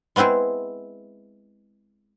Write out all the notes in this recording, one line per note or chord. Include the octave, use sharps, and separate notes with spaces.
G#3 B3 C4 E4 G#4